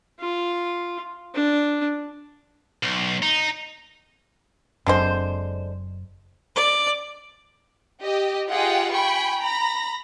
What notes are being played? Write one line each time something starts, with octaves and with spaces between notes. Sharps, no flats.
F4
D4
B1
D#4
F#1 F#2 D3 G#3 C4 C5
D5
G4 D#5
F4 G4 G#4 D#5 F#5 G5
G5 G#5 B5 C#6
A#5 B5 A#6